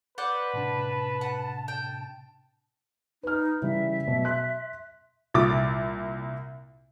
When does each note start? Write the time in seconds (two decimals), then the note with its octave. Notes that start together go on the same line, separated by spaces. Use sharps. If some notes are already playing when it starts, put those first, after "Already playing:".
0.18 B4 C5 D5 F#5 G6
0.54 A2 C3 D4 A5
1.21 F#5
1.68 G5
3.23 D#4 B4 F6
3.62 C#3 E3 G3 E5
4.08 B2 F#3
4.25 C6 F#6
5.34 C2 A#2 D6 A6